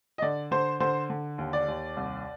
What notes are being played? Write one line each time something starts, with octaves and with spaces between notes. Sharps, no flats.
D#5
D3 D5
D3 C5
D3 C5
D3
D#2
D5
D#2
C2